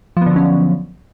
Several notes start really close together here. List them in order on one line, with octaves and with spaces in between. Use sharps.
F3 B3 D3 F#3 C#4